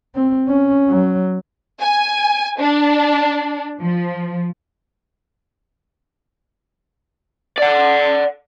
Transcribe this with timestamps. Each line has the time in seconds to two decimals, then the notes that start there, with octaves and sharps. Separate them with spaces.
0.15 C4
0.48 C#4
0.88 F#3
1.81 G#5
2.59 D4
3.80 F3
7.58 D5 F#5